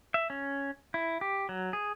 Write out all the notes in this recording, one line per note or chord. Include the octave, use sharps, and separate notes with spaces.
E5
C#4
E4
G4
F#3
G#4